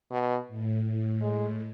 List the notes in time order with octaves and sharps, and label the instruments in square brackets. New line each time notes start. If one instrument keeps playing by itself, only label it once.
[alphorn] B2
[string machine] A2
A2
[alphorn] G#3